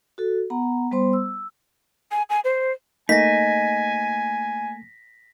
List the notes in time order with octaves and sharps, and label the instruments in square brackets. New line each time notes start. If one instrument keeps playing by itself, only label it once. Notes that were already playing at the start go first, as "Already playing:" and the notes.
[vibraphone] F#4 A4
B3 F#5 A#5
G3 B3 C5 C6
E6
[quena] G#5
G#5
C5
[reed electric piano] A3 A#3 [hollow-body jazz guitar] D#4 [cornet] G#5 [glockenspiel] A#6 B6